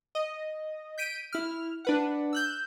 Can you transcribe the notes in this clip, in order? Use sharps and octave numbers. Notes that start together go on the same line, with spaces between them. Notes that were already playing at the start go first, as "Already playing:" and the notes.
D#5
G6 B6 D7 D#7
E4 F6
D4 B4 F#5
E6 F#6 G6